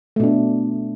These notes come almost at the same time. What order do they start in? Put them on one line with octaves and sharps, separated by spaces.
A3 B2 D4